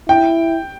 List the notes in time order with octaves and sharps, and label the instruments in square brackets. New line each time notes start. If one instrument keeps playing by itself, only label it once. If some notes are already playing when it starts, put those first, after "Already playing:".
[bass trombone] E4 [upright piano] G5